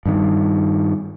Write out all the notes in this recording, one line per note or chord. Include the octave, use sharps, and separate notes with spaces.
G2 D#3